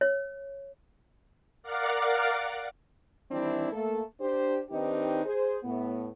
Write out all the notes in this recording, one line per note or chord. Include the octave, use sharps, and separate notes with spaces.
C#5
A#4 D5 F5 F#5 D6
D#3 E3 G3 C4 D4 E4
A3 A#3 A4
D4 G4 C5
D#3 C4 D4 D#4 G4 B4
G#4 C5
A2 B3